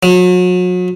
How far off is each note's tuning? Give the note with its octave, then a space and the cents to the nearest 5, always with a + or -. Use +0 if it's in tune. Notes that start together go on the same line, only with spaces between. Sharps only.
F#3 -35